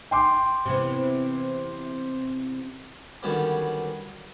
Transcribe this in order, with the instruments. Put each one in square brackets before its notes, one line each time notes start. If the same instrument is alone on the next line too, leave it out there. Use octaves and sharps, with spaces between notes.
[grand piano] G5 C6 D6
[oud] C3 E3 B3
[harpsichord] D3 D#3 F#3 G3 B3 C#4